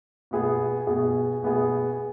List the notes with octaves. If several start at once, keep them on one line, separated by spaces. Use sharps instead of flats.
B2 B3 G#4
B2 B3 G#4
B2 B3 G#4